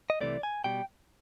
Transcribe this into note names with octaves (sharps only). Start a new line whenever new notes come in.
D#5
C2 C3 E3 A3 D5
G#5
B2 G3 G5